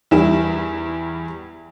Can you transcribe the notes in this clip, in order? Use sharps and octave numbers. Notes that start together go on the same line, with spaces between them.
E2 G3 E4 E7